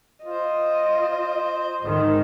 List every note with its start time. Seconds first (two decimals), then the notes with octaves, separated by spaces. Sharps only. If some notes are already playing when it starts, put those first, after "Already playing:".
0.25 F4 C5 D#5
1.82 G#2 D#3